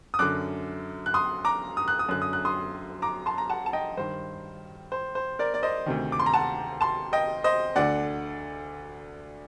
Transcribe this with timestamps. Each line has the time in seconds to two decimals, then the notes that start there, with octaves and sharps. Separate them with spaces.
0.14 D#6
0.19 F#2 D3 D6 F#6
1.06 F#6
1.14 C6 D#6
1.45 A#5 D6
1.77 D#6
1.88 F#6
1.99 D#6
2.09 F#2 D3 F#6
2.22 D#6
2.33 F#6
2.45 C6 D#6
3.02 A#5 D6
3.26 A5 C6
3.38 A#5
3.50 F#5 A5
3.66 A5
3.73 D#5 G5
3.97 G2 D#3 C5
4.92 C5
5.15 C5
5.39 A#4 D5
5.54 D5
5.63 C5 D#5
5.86 D2 C3 D#3
6.12 D6
6.19 C6
6.26 A#5
6.34 F#5 A5
6.81 A5 C6
7.13 D#5 G5
7.44 C5 D#5
7.76 D2 D3 D5 F#5